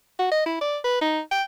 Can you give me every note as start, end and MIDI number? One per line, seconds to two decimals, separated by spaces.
0.19 0.29 66
0.31 0.43 75
0.46 0.57 64
0.61 0.77 74
0.84 1.00 71
1.01 1.19 63
1.31 1.43 79